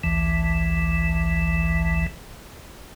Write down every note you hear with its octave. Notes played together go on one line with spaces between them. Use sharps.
A1 D2 E3